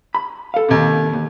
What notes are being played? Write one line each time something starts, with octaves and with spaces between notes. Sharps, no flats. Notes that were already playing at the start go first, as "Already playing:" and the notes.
B5
A4 F5
D#2 C3
D#2